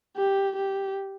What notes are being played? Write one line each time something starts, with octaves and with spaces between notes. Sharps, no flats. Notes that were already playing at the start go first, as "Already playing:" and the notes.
G4
G4